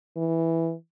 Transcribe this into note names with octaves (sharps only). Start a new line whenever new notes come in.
E3